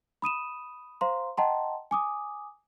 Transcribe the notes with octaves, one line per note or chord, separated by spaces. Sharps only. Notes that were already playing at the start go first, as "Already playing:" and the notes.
B5 D#6 D#7 E7
C5 F5 A#5 C6
D#5 F#5 G5 A5 A#5 C6
G#5 D6 D#6